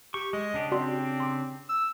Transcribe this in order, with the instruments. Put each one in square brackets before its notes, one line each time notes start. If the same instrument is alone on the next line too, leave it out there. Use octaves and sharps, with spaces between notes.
[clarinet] G4 [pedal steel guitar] C#6
[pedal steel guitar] G#3 [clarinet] D#5
[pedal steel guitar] C#3 D4 G4
[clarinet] C4 [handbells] F#4 D5 C6
[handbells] C6 D6
[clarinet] E6